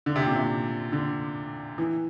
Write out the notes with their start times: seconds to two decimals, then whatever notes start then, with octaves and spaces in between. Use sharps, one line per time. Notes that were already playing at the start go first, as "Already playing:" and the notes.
0.06 D3
0.16 C3
0.26 A#2
0.36 C3
0.92 D3
1.78 E3